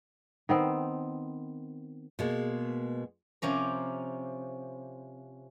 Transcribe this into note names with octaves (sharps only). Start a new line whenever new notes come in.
D#3 B3 C4
B2 G#3 A#3
C3 F3 C#4 A#4